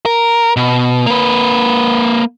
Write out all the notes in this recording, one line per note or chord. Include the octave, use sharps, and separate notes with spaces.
A#4
B2
A#3 B4